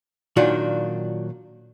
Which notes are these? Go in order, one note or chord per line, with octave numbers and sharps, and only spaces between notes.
A#2 D#3 F#3 D4 F4 F#4